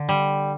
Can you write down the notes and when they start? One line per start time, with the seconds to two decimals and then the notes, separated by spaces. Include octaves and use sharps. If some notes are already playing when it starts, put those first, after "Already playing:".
Already playing: D3
0.09 G3